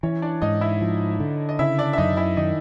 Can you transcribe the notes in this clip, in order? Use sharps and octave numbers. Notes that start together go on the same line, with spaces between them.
E3 C#4 C#5
D4 D5
G#2 D#4 D#5
E4 E5
F3
D3
D#5
C#3 E4 E5
D4 D5
E5
F#2 D#4 D#5
E4 E5
D#3 D#4 D#5